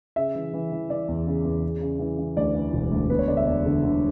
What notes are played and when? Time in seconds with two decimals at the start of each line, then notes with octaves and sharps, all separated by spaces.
0.16 C#3 E5
0.35 E3
0.53 E3
0.72 E3
0.90 E3 D5
1.08 E2
1.27 C#3
1.45 E2
1.63 C#3
1.81 C#3
1.99 E3
2.18 E3
2.37 D2 D5
2.54 E3
2.73 E1
2.92 D2
3.10 B3 B4
3.19 C#5
3.28 D3 D5
3.37 E5
3.47 E2 D5
3.65 D3
3.82 D3